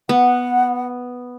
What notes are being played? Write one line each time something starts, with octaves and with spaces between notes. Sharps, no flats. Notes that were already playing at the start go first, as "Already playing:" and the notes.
B3 F#5